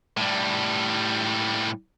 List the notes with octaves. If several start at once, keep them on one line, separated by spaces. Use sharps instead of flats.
A2 G3